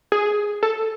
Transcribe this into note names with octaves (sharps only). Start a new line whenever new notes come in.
G#4
A4